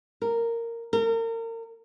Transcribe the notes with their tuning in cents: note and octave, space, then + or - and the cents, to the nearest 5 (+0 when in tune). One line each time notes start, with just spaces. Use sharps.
A#4 -10
A#4 -35